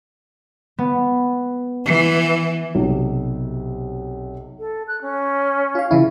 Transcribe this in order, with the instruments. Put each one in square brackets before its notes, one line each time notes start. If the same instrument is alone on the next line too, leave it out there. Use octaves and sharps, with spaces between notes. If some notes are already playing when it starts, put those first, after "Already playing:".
[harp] B3
[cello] E3
[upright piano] B1 C3
[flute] A4
F#6
C#4
[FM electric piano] F4 F5
C#3 E3 E4